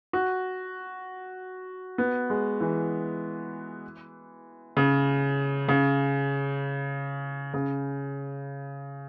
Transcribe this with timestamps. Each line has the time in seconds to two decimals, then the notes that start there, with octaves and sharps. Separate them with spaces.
0.13 F#4
1.98 B3
2.30 G#3
2.61 E3
4.77 C#3
5.68 C#3
7.54 C#3